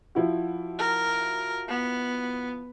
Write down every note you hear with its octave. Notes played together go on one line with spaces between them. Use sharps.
F3 E4 F#4
A#4
B3